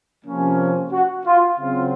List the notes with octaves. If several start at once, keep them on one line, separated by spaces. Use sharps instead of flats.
C3 F3 A#3 C#4
F#4
F4
C#3 F#3 C4 F4